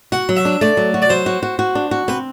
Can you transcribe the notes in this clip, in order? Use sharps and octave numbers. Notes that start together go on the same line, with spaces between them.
F#4 F#5
F#3
E5
D4
A3 D5
F#3
F#4
D5
F#3 C5
F#4
F#4
F#4
D4
F#4
C4 B4